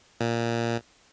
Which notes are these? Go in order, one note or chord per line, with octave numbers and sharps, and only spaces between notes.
A#2